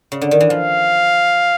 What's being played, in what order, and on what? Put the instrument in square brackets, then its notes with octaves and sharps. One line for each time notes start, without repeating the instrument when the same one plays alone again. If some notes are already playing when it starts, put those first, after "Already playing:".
[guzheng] C#3
D3
D#3
E3
[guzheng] F3 [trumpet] F5